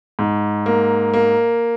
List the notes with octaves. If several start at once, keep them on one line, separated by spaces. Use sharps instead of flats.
G#2
A#3
A#3